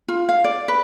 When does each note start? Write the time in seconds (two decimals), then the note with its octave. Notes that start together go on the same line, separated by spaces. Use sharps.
0.08 F4
0.29 F5
0.44 D5
0.68 B4